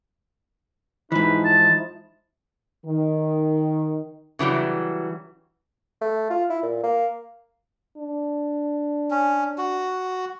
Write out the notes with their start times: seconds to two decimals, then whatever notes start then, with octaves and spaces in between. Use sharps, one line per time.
1.12 G#2 E3 F3 D#4 E4 B4
1.45 A5
2.86 D#3
4.39 C#3 E3 F#3 G3
6.01 A3
6.30 F4
6.49 E4
6.62 A#2
6.83 A#3
7.97 D4
9.11 C#4
9.58 F#4